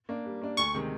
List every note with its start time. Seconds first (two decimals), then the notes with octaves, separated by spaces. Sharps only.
0.09 A#3 D4
0.26 G3
0.42 A#3 D4
0.57 D2 C#6
0.74 C3 D#3 G#3